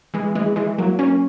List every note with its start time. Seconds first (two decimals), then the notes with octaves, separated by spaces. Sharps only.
0.14 E3 G#3
0.35 E3 G#3
0.56 E3 G#3
0.78 F#3 A#3
0.99 A#3 C#4